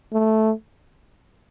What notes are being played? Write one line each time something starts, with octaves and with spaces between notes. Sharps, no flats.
A3